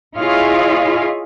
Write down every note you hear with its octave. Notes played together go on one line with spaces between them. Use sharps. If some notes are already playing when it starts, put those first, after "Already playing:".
E4 F4 G#4 C#5 D#5 F5